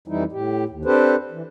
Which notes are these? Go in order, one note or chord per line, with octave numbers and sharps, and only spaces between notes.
F2 E3 G3 D#4 E4
A2 G4
D#2
C4 D4 G4 A4 B4 C5
E3